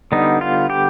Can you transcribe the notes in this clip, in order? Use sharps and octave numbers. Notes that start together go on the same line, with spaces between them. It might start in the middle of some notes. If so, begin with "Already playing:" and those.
D3 G3 B3 D#4
F4
G4